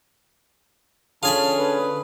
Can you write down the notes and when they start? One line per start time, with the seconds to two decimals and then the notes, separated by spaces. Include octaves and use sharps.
1.23 D3 C#4 F4 G#4 G#5 A5 B5
1.58 B4